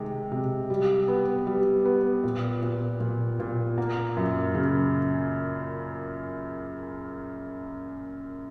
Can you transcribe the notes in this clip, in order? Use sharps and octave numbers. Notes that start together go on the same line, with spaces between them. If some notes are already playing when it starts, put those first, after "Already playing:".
Already playing: C3 D#3 G#3
C3
G3
B3
G3
B3
A#2
A#2
A#2
A#2
A#3
F#2
C#3